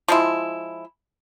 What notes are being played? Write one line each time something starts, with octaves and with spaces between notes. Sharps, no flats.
F3 G#3 E4